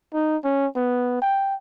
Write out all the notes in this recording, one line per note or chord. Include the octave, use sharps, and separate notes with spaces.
D#4
C#4
B3
G5